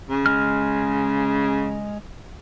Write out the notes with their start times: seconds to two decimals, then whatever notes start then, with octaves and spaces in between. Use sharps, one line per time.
0.10 C#3
0.26 G#3 F6